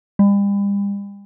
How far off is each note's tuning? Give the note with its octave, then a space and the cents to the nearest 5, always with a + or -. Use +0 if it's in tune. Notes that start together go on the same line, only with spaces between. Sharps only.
G3 +40